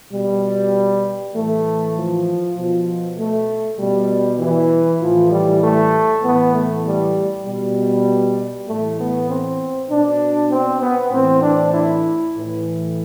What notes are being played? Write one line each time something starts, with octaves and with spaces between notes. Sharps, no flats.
B2 G3
A2 E3 A3
F3
B2 F3
A3
B2 G3
E3
A2 E3 F3
G3
A3
A2 E3 B3
A3
G3
B2 G3
A2 E3 A3
B3
C4
B2 D4
C4
B3
A2 E3 C4
D4
E4
A2 E3